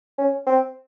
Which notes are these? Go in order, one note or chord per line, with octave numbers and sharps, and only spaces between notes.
C#4
C4